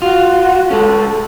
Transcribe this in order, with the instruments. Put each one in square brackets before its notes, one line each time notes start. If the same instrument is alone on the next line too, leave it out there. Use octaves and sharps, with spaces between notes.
[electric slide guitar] F4 [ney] F#4
[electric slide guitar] G#3 C#4 [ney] A4